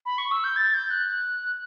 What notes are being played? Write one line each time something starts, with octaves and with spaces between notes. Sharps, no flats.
B5
C#6
E6
G6
A6
G6
F#6